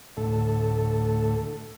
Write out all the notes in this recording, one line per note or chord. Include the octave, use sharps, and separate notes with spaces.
D2 A2 A4